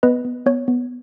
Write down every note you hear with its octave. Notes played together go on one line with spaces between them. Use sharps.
B3 B4 D#5
B3
B3 C#5
B3